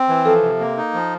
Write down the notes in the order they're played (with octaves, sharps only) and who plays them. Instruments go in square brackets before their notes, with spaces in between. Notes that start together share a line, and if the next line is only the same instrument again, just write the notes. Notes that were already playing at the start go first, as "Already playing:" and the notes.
Already playing: [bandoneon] C4
E3
[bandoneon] F3 [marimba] A4
[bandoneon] C3
A#3
D#4
F3